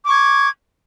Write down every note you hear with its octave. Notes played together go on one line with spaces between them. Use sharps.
C#6 D6 G#6